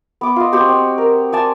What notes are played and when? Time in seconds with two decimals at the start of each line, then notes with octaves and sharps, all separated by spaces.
0.21 B3 D6
0.36 F4 D#5
0.52 C4 F#4 G4 C5
0.69 C4
0.98 A#4
1.32 D5 G#5 A5